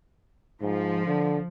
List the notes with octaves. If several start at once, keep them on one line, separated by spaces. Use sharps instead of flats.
G#2 F3
D3